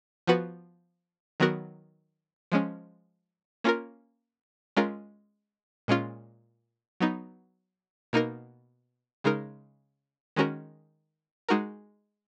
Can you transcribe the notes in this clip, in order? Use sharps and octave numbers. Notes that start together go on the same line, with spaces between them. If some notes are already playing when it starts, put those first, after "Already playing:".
F3 B3 F#4 B4
D#3 F#3 B3 F#4 A#4
F3 G#3 C#4
A#3 C#4 F4 A#4
G#3 C#4 F4 A#4
A#2 G#3 C#4 F4
F#3 B3 D#4
B2 A#3 D#4 A#4
C#3 G#3 D#4 A#4
D#3 G#3 C#4 F#4 A#4
G#3 D#4 F#4 A#4